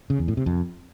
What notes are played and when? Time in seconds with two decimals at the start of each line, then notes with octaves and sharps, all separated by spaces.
0.10 C#3
0.19 E2
0.28 A2
0.37 C3
0.46 F2